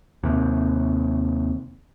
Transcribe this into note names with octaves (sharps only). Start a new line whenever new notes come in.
D#2 C3